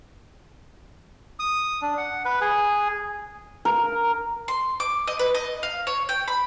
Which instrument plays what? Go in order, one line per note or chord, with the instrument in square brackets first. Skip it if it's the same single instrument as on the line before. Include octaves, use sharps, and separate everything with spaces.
[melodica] D#6
D4
F#5
B4
G#4
[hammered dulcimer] A#4
[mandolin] C6
D6
D#5
B4
D#5
F5
C#5
G5
B5